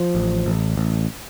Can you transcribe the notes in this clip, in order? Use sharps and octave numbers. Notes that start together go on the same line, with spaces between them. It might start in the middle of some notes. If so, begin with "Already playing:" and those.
Already playing: F3
A1
A1
A1